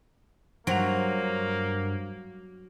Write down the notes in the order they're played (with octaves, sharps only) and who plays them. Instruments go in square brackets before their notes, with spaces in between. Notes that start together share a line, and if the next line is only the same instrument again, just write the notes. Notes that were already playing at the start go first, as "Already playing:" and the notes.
[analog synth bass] G2 [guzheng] F#3 [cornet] A#3 [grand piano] C5 F#5 F7